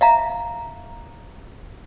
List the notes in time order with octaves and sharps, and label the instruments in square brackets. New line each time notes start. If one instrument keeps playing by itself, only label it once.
[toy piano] E5 F5 A#5